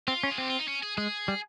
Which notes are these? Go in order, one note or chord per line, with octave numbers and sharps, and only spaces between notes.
C4 F4
C#4
G#4
C4 G4
F4
D#4
C#4
G#4
G#3 G#4
G3